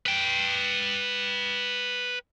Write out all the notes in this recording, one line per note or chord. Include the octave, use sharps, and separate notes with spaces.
B4 G5